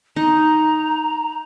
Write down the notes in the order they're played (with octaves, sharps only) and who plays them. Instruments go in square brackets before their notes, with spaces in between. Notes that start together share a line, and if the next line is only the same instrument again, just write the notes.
[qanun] D#4 [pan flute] A#5